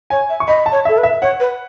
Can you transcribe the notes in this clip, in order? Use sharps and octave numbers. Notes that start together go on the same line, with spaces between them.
C#5 G#5
E5
C#6
D#5 B5
A5
C#5
A4 E5
B4
E5
C#5 F#5
B4